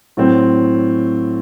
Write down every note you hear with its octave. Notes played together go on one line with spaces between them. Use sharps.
A2 F#3 C4